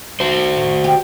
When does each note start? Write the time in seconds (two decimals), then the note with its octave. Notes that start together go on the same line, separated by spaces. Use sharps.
0.20 F#4 C5
0.56 A2
0.84 G4